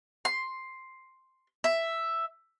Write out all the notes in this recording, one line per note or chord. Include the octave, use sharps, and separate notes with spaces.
C6
E5